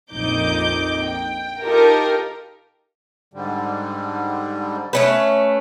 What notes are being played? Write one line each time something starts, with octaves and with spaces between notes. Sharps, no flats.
A#1 F2 A#2 D#4 D6 G6
G5
D#4 F4 G4 A4 A#4
G#2 D3 G3
A3 C#4 B4